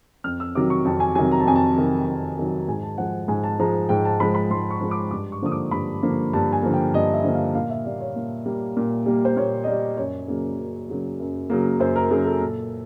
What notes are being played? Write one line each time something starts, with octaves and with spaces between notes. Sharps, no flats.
F2 F6
E6
C3 D#3 F#3 D6
C#6
F2 A5
G#5
C3 D#3 F#3 G#5
A#5
A5
F2 G#5
A5
C3 D#3 F#3
F2
C3 D#3 F#3
G#2 G#5
A5
F3 G#3 F#5
G#2 G#5
A5
F3 G#3 A#5
G#2 G5
A5
F3 G#3 B5
B5
G#2 C6
C#6
F3 G#3
D6
G2 D6
C#6
D3 F3 A#3 D#6
D6
G2 B5
D3 F3 A#3
G2 A5
G#5
D3 F3 A#3
G5
G2 D#5
E5
D3 F3 A#3
F5
A#2 F5
E5
G3 A#3 D5
C#5
A#2
G3 A#3
A#2
G3 A#3
C5
A#2 C#5
D#5
G3 A#3 D5
F#2 C#5
C#3 F#3 A#3
F#2
C#3 F#3 A#3
F#2
C#3 F#3 A#3
F#2 C5
A#4
C#3 F#3 A#3 G#4
A4
A#2